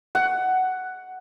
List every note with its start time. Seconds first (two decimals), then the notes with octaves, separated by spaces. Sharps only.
0.15 F#5